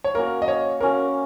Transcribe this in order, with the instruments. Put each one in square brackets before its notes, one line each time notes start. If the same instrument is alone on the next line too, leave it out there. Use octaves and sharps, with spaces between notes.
[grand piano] C#5
[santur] A#3 C#4 F#4 [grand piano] A#4
[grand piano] D#5
C#5
[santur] A#3 C#4 F#4 [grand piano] A#4